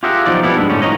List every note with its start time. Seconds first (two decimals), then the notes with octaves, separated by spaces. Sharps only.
0.03 F4 G4 G#4 A#4 E5 F#5
0.26 B1 F3 D#4 D5
0.43 G3 B3 E4 A4
0.57 G2 B2 G#3 D4
0.69 A2 D3 A3 C#4
0.82 F3 D#4 C#5 D#5